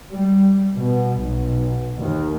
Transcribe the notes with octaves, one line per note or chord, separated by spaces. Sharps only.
G3
B2
B1
D#2